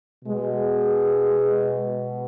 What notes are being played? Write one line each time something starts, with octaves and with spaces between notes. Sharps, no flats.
B2 G#3